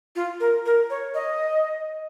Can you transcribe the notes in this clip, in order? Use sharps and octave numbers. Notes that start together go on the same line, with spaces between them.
F4
A#4
A#4
C#5
D#5